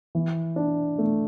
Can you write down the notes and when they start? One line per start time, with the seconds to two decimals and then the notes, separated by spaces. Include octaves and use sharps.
0.15 E3
0.56 D4
0.98 A3